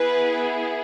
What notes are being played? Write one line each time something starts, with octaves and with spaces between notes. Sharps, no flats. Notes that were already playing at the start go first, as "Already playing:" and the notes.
Already playing: B3 E4 G#4 B4